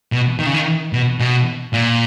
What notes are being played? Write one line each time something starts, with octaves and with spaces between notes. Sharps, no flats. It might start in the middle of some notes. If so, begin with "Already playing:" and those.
B2
D#3
C#3
D#3
B2
B2
A#2